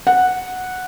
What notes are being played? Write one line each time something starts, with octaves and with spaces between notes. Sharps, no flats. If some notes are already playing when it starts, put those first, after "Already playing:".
F#5